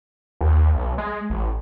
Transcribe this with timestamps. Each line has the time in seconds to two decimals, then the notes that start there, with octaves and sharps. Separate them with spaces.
0.41 D#2
0.75 B1
0.98 G#3
1.30 A1